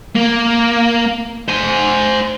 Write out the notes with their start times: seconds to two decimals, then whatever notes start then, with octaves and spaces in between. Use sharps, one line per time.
0.16 A#3
1.49 C5 G#5